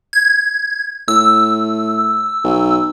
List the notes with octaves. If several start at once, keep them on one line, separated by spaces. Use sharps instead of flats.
G#6
A2 E6
B1